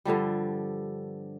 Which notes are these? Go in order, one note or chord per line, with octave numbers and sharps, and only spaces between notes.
G2 D3 F3 G3